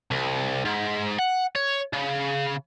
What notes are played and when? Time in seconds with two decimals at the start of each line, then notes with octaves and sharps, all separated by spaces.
0.11 C2
0.65 G#2
1.19 F#5
1.56 C#5
1.93 C#3